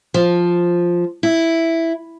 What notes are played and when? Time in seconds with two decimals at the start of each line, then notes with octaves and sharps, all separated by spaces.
0.14 F3
1.23 E4